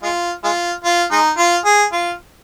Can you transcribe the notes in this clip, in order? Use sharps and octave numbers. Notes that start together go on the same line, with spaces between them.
G#3 F4
G#3 F4
F4
G#3 D#4
F4
G#4
F4